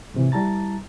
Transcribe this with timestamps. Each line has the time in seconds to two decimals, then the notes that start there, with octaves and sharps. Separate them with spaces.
0.14 G#2 C3 E3
0.32 G3 E4 A5 A#5 A6